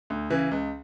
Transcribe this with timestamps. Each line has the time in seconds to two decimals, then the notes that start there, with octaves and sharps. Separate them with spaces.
0.10 D2
0.30 C#3 E3
0.51 C#2